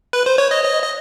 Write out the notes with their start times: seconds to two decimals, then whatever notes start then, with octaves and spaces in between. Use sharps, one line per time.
0.13 B4
0.26 C5
0.38 C#5
0.51 D#5
0.64 D#5
0.82 D#5